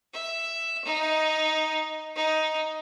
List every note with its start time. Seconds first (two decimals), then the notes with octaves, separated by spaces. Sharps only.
0.13 E5
0.85 D#4
2.15 D#4